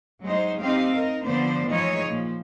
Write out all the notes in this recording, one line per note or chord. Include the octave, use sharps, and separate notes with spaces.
F#3 G#3 D#4 C5
C4 D#4 G4 F5
D#4 A#4
D3 F3 B3 C5 D5
E3 F3 G#3 D#4 C#5 D#5
A#2 F3